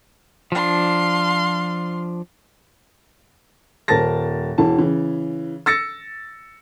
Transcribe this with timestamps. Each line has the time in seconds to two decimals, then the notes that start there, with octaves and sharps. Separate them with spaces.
0.52 F3 D4 F5 C6
3.88 D#1 A#4 C5 A5 A6 A#6
4.58 E1 E3 A5
4.78 C#3 E3
5.66 E6 A6 A#6 C#7